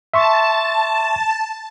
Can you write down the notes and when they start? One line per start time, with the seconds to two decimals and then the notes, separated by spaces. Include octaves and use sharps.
0.14 E5 A5 C6 C#6